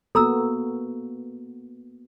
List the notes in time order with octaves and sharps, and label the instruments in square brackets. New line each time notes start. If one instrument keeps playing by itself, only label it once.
[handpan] A#3 B3 F#4 [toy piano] A4 A#5 E6